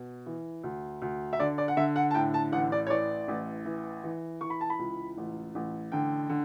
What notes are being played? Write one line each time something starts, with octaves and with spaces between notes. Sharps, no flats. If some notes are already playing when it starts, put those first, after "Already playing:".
Already playing: B2
E3
D2
D2
E5
D3 D5
D5
F#5
D3 E5
F#5
A5
A2 G5
A5
A1 F#5
D5
C#5
E3 D5
A1
E3
E3
E3 C#6
B5
A5
B5
C#2
A1
A1
D3 G5
D3